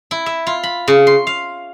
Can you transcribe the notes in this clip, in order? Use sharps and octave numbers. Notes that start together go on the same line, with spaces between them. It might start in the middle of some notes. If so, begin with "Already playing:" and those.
E4
E5
F4
B5
C#3
C6
F5